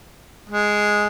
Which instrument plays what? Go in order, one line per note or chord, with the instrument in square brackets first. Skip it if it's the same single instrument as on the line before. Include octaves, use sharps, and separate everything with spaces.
[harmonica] G#3